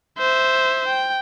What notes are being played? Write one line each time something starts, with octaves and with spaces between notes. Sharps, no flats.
C5 E5
G5